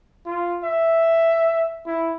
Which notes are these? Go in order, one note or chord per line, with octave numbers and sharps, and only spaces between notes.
F4
E5
E4